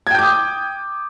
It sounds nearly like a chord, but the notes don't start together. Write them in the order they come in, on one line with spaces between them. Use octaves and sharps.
G#6 G5 G6 D6 D#6